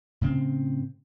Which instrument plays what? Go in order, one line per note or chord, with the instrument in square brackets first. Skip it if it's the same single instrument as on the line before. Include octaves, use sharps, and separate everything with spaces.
[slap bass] A2 C#3 C4